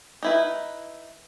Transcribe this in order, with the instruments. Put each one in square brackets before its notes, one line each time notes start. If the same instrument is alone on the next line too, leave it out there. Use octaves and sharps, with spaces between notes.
[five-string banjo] D#4 E4 B4